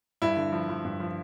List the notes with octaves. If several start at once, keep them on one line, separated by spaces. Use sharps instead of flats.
G2 E4
D3
F3
F3
G2
F3